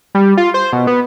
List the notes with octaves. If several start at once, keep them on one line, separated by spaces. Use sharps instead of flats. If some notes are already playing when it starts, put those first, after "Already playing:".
G3
F4
C5
B2
B3